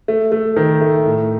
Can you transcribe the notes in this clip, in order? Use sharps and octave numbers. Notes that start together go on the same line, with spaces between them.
A3
A3
D#3
A3
A2